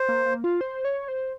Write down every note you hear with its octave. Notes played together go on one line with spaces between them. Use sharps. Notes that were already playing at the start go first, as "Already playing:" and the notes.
Already playing: C5
A#3
A#3
F4
C5
C#5
C5